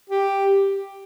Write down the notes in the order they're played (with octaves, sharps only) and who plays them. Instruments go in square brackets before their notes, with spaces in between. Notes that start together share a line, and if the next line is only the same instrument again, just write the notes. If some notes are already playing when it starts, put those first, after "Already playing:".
[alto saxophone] G4